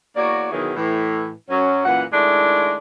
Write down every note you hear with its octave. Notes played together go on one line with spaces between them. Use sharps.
E2 A#3 F#4 C#5 D5
E2 B2 D#3 E3 F#3 G#4
A2 E3
F#2 F#3 C#4
F#2 A#2 E3 F#5
D#3 G#3 A3 D4 E4